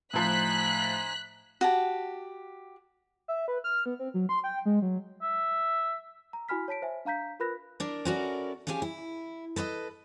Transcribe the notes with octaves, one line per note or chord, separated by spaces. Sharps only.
A2 F3 D#4 C5 G#5 F#6 B6
F#4 G4 A5
E5
B4
F6
B3
C4
F#3
C6
G5
G#3
F#3
E5
A#5
E4 F#4 G#5 B5 F6 B6
C#5 A5 B6 D7
C5 E5 G#5
D4 F5 A#5 G6 B6
F4 A#4 B4 B5 F#6 A#6
D4 A#4
C#4 E4 F#4 A4 A#4 D5
F3 C#4 G4 G#4 G#5
E4
A4 B4 C#5 D#5